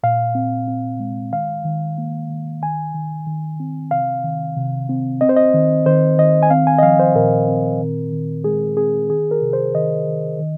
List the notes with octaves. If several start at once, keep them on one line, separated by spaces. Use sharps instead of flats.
A#2 F5
C4
C4
G#3
D#3 F5
D#3
A#3
D#3
D#3 G#5
D#3
D#3
C4
C3 F5
D#3
C3
C4
C4 D#5
C5
D#5
D#3
D#3 C5
D#3 D#5
G#5
C4 F5
G#5
D#5
F3 F5
C5
A#2 A#4
C4
D#3
D#3
G#3 G#4
C4 G#4
D#3 G#4
A#4
C3
C5
D#3 D#5
D#3
D#3